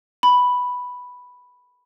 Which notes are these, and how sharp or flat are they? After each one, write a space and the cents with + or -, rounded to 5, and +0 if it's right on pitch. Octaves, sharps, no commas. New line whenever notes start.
B5 +0